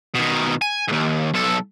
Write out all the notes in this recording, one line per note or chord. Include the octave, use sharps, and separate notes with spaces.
B2 D#3
G#5
D#2 G#2
B1 A4